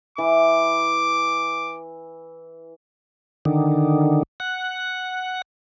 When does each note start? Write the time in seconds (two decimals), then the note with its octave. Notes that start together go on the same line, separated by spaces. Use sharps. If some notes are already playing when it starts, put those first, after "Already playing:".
0.18 E3 D6
3.45 D3 D#3
4.40 F#5